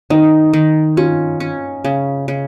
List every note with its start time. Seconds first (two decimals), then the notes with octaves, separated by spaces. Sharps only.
0.10 D#3 D#4
0.53 D#3
0.97 C#4 F4
1.40 C#4
1.84 C#3
2.28 C#3